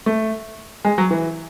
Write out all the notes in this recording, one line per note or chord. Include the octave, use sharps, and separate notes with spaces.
A3
G#3
F#3
E3